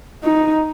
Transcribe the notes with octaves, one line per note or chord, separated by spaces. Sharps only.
D#4